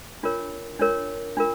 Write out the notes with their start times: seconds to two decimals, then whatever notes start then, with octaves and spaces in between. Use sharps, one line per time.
0.23 D4 F4 A#4 C#5
0.79 D4 F4 A#4 C#5
1.37 D4 F4 A#4